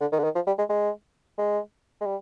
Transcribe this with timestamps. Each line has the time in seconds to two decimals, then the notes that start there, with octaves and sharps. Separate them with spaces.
0.01 D3
0.12 D#3
0.19 D3
0.24 D#3
0.35 F3
0.47 G3
0.59 G#3
0.69 G#3
1.38 G#3
2.01 G#3
2.06 G3